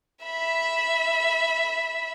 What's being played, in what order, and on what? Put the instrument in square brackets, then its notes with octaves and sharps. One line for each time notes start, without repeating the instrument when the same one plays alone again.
[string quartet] E5 B5